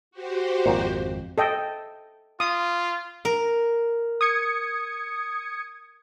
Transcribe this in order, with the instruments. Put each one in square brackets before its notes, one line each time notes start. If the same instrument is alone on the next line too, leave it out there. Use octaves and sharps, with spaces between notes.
[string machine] F#4 G4 C5
[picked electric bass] G#1 F2 [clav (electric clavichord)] A#2 F3
[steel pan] A4 D#5 G5
[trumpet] F4 [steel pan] D#6
[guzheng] A#4
[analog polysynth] D#6 G#6 C#7